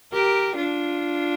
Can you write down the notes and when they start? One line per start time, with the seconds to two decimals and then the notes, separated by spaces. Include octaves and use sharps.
0.13 G4 A#4
0.56 D4 F4